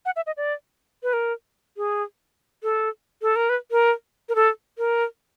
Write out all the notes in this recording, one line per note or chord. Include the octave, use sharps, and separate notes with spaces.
F#5
E5
D#5
D5
B4
A#4
G#4
A4
A4
A#4
B4
A#4
A#4
A4
A#4